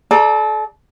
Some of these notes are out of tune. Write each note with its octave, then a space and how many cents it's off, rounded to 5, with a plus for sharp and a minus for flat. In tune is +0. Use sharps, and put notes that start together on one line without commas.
A4 -35 D5 +20 A#5 +0